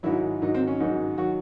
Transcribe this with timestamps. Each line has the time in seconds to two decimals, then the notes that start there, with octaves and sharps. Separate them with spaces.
0.03 G#2 D#3 F#3 E4
0.42 G#2 D#3 F#3 D#4
0.54 C4
0.68 C#4
0.80 G#2 D#3 F#3
1.18 D#3 F#3 F#4